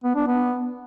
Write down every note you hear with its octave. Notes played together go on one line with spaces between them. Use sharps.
B3
D4
B3